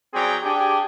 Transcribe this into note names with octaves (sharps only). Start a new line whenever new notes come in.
F#3 C4 G#4 D5 G5 A#5
D4 G4 G#4